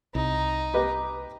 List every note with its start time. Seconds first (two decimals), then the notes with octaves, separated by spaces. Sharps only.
0.15 C2 D#4
0.74 G4 B4 D#5